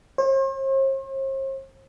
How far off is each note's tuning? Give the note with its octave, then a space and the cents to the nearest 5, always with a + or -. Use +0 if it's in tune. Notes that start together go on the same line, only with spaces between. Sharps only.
C5 +45